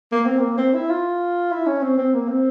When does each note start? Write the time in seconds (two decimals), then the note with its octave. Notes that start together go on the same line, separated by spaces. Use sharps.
0.12 A#3
0.26 C4
0.39 A#3
0.58 C4
0.74 E4
0.90 F4
1.52 E4
1.66 C#4
1.82 C4
1.98 C4
2.14 A#3
2.28 C4